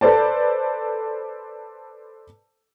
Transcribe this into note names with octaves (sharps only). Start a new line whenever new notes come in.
A4 B4 C5 D5 A5